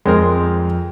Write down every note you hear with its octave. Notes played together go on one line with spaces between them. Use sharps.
F2 G#3 C4 A#4